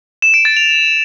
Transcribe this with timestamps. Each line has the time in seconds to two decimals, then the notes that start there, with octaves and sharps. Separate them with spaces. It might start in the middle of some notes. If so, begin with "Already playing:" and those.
0.22 E7
0.34 D7
0.45 A6
0.57 F7